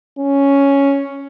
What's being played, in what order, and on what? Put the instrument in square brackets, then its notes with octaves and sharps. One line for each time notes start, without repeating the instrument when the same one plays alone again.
[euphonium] C#4